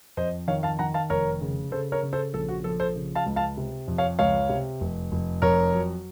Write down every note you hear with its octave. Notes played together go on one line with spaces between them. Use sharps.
F2 C5 D#5
D#3 C#5 F5
F5 A5
D#3 F#5 A#5
F5 A5
F1 A#4 C#5
C#3
C#3 A4 C5
A#4 C#5
C#3
A4 C5
A#1 A4
F#4
F3 A4
A4 C5
C#3
F5 A5
C#2
F5 A5
C3
F2
C#5 F5
C#2 C#5 F5
C3
F1
F1
F2 A#4 C#5
F#3